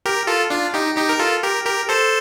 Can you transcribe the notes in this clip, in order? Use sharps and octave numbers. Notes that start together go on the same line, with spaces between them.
G4 A#4
F4 A4
D4 F4
D#4 G4
D#4 G4
A#4
F4 A4
G4 A#4
G4 A#4
A4 C5